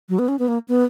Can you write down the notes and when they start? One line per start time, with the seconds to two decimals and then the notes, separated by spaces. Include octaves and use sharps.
0.09 F#3
0.19 B3
0.28 C#4
0.39 B3
0.48 A#3
0.68 B3